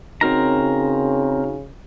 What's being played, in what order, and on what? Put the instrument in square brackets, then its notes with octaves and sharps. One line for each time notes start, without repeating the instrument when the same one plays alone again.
[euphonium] C#3 [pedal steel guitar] C4 A#4 A#5 [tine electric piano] D#4 F#4 C#5